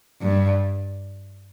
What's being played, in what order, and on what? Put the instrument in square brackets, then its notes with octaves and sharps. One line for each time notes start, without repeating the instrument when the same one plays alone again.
[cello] G2